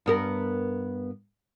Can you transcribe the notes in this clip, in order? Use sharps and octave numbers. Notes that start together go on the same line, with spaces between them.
G2 B3 A#4